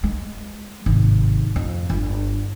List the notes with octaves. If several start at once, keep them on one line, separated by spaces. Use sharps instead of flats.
G#3
G#1 C3
F2
G1